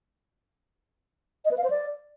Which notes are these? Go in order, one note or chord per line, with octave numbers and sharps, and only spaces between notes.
D#5
B4
F5
C5
D5